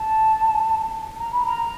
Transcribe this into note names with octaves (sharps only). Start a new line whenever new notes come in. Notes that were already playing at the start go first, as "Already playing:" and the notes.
Already playing: A5
A#5
B5
A#5